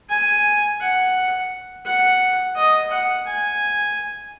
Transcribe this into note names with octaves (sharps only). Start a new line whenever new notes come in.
G#5
F#5
F#5
D#5
F#5
G#5